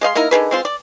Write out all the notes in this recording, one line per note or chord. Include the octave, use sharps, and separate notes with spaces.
G#3 D#5 F5 C6
A#3 D#4 E4 A#4
D3 D#3 G#4 B4
G#3 C4 F4
D5